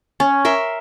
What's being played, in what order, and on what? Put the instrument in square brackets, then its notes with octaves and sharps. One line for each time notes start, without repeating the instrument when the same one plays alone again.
[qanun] C#4
A#4 E5 C6